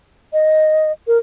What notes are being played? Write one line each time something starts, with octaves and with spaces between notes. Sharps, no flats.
D#5
A#4